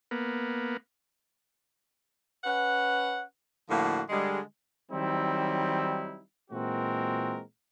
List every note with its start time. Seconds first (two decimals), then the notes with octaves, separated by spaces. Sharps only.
0.11 A#3 B3
2.44 C#4 B4 F#5
3.69 A2 D3 F3 A#3 F#4
4.09 D3 G3 G#3
4.92 D#3 F#3 G3 C4 D#4 E4
6.51 A#2 E3 G#3 C4 F#4 A#4